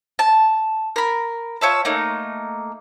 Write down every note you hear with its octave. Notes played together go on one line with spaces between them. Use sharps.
A5
A#4 B5
F4 C#5 E5 A5
A3 A#3 D#4